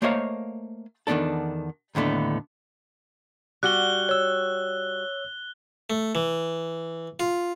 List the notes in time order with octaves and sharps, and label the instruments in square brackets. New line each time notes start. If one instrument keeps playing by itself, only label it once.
[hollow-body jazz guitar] A3 A#3 C5 C#5 D#5 F5
E2 D#3 G3 B3 D4 A4
D#2 A2 D3 A3 B3
[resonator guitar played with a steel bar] G3 F#4 [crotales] F#6 G7
[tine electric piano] C#5 E6
[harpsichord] A3
E3
F4